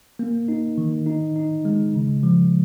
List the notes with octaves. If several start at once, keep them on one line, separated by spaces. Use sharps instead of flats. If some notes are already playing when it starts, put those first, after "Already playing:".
A#3
D#4
D#3
D#4
D#4
G#3
C#3
F3